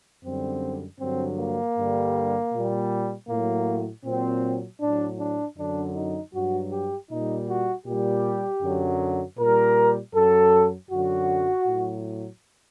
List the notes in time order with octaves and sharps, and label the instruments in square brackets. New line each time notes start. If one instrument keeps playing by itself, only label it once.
[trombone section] F#2 D3 G3 C4
G2 D3 F#3 C4
A#3
G2 D3 G3
A#2 G3
A2 F#3 A#3
A#2 F#3 C4
A2 F#3 D4
D4
F#2 D3 F#3 D4
D#4
G2 F#3 F#4
G4
A#2 G3 D#4
F#4
A#2 G3 G4
F#2 D3 F#3
A#2 G3 A#4
F#2 F#3 A4
F#2 D3 F#3 F#4
A2 F#3